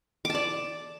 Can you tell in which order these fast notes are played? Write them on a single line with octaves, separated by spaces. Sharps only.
D6 A5 D5